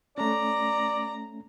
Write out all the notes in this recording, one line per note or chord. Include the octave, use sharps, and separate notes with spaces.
A3 C#4 D5 A#5